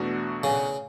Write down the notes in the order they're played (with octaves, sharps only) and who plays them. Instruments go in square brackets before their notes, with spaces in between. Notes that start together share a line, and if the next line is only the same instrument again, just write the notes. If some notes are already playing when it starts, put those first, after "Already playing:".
Already playing: [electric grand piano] E2 B2 A3 D4 F#4
[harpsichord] C#3